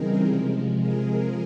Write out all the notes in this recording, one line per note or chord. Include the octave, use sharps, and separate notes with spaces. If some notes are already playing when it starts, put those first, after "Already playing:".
Already playing: C#3 E3 G3 C4 D#4 G#4 A#4
C3 F3 G#3
G#4 A#4